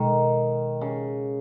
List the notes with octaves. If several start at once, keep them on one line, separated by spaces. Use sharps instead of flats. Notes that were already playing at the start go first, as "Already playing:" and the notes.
Already playing: B2 D#3 G#3 D#4 A4
C#3